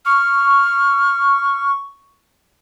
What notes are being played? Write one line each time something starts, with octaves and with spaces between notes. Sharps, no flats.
C#6 F6